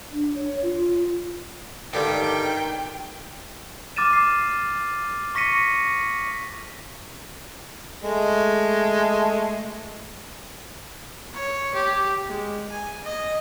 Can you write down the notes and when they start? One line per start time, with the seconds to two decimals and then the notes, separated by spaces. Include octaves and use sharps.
0.12 D4
0.34 C#5
0.62 F4
1.94 G2 D3 D#3 G3 G5
3.96 D6 F6 A6 D#7 E7
4.13 C7
5.35 C#6 A#6 B6 C#7 D#7
8.03 G#3 A3
11.34 C#5
11.74 G4
12.26 G#3
12.69 G#5
13.04 D#5